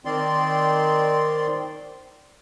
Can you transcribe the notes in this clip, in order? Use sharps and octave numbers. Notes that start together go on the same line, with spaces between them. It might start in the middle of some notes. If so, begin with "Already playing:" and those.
D#3 C4 D5 C6